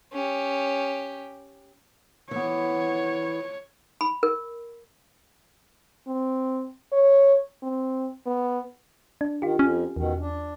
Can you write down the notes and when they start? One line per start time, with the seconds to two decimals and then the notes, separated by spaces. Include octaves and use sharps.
0.13 C#4 G4
2.31 E3 B3 C#5
4.01 B5
4.23 A#4
6.07 C4
6.93 C#5
7.63 C4
8.26 B3
9.21 D4
9.42 D#3 F4 G4
9.59 F2 C#4
9.96 E2 B2 D#3
10.20 D4